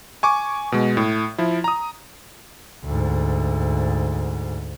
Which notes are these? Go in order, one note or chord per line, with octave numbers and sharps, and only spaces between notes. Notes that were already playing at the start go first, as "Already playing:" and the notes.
G#5 C#6 D6
B2 G#3
A2
F3 E4
A#5 D#6
D2 G#2